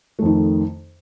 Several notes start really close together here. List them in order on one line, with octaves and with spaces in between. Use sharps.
A3 F2 D#3